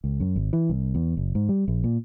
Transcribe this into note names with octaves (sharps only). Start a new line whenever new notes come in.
C#2
F#2
G#1
E3
C2
E2
F#1
G#2
G3
A#1
A#2